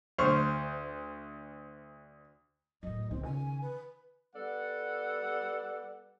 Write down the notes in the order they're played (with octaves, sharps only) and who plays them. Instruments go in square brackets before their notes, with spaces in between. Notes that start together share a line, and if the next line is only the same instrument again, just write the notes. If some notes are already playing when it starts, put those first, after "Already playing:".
[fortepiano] D2 C5 C#6 F6
[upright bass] F#2 A2 [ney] D#5
[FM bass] C#2 [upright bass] D#3 [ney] C4
[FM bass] C#3 [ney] G#5
[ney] B4
[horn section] G3 B3 A4 D5 F#5